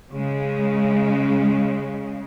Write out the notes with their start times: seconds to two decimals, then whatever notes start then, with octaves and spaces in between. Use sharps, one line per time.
0.12 C#3 G#3